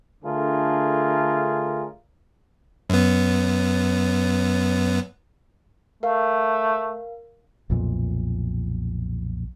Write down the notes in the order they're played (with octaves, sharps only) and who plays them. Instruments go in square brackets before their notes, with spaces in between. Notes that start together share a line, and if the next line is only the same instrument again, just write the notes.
[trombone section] D3 A3 D4 F4 G#4 A#4
[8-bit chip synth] F#2 B3
[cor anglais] A3 [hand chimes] A#4 F5
[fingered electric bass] B1 F2 A#2